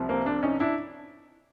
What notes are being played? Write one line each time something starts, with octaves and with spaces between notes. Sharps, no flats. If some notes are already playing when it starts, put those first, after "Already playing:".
Already playing: C2 C3 F3
A#3 C4
C4 D4
C#4 D#4
D4 E4